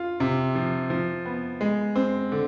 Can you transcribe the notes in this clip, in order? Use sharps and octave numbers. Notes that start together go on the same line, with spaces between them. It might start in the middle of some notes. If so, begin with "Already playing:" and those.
Already playing: F4
C3
F3
F3
B3
G#3
C4
D3